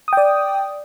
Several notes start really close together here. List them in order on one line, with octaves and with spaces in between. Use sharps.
D#6 G5 D5